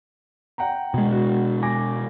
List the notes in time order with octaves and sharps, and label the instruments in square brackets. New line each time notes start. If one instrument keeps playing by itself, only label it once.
[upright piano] F#5 G5 A#5
[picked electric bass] B2 G#3
[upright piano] F#4
G#5 D6 A#6